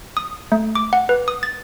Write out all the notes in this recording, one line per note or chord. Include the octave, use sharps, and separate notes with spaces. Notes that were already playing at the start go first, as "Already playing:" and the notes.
D#6
A3
D6
F#5
B4
D#6
A6